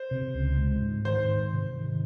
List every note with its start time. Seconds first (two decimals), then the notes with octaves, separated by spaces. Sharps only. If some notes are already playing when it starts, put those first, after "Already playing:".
Already playing: C5
0.11 C3
0.35 C#2
0.58 G#3
0.82 G#2
1.05 D#3 C5
1.29 G#2
1.53 C3
1.76 D#3